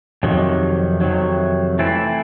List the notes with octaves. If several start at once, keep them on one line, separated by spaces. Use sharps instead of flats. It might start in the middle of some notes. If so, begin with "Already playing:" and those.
F2 C3 D#3 F#3
F2 C3 D#3 F#3
E3 A3 C4 E4